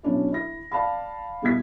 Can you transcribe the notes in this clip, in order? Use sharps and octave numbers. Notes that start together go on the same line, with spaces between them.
B2 F#3 C#4 D4 E4
E4 A#6
D5 F5 A5 B5
B2 G3 B3 E4 G#6 B6